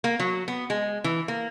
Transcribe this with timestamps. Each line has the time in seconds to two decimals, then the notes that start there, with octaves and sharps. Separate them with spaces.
0.04 A#3
0.20 F#3
0.48 B3
0.70 G#3
1.04 E3
1.28 A#3